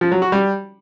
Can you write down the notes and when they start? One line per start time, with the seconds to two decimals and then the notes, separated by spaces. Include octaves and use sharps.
0.01 F3
0.12 F#3
0.22 F#4
0.32 G3